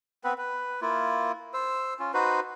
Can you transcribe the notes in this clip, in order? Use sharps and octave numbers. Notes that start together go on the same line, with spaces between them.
B3 C4 B4
B4
A#3 E4 F4
C5 E6
C#4 F4
D#4 F#4 B4 C5